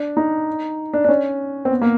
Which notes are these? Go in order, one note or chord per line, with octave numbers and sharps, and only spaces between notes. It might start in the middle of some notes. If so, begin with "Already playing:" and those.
Already playing: D4
D#4
D4
D4
C#4
C4
B3
A#3